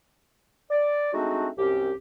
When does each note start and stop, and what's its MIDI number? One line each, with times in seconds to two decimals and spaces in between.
0.71 1.13 74
1.13 1.48 56
1.13 1.48 57
1.13 1.48 60
1.13 1.48 62
1.13 1.48 63
1.13 1.48 66
1.58 1.93 36
1.58 1.93 42
1.58 1.93 60
1.58 1.93 61
1.58 1.93 67